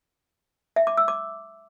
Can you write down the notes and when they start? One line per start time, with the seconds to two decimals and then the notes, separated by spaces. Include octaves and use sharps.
0.76 E5
0.87 D6
0.97 E6
1.08 D6